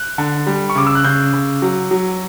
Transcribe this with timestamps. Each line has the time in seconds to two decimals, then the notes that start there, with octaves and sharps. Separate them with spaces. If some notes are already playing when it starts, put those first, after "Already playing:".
Already playing: F#6
0.18 D3
0.47 G3
0.70 C#6
0.75 C#3 D6
0.87 E6
0.95 F#6
1.04 C#3 G6
1.33 C#3
1.62 F#3
1.91 F#3